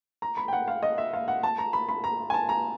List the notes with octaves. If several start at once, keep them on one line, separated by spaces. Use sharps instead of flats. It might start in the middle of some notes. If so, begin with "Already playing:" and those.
A#5
B5
G5
F#5
F5
D#5
E5
F5
F#5
A5
A#5
B5
B5
A#5
G#5
A5
A#5